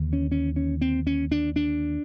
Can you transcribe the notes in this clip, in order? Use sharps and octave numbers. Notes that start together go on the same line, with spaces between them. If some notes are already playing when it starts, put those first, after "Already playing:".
Already playing: D#2 D3
C#4
C#4
C#4
C4
C#4
D4
D4